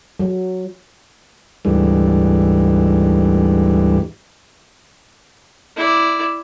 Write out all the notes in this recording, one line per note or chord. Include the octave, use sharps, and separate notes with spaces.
F#3
D2 G#2 E3 G3
E4 D5